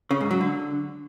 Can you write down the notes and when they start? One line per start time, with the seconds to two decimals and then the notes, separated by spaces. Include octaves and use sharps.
0.11 C#3
0.21 G#2
0.31 F#3
0.41 D3